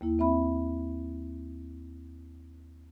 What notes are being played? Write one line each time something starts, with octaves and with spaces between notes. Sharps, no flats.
D#2 A#3 E4
C4 E5 B5